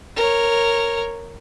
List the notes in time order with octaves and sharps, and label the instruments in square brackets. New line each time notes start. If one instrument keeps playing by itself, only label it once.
[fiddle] A#4 C#5